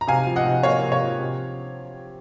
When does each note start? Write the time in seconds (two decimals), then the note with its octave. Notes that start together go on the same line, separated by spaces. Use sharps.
0.01 A#5
0.07 C3 F5 G#5
0.27 F3
0.36 D#5 F#5
0.45 C3
0.63 A#3 C#5 F5
0.83 C3
0.92 C#5 F5
1.01 F3
1.20 C3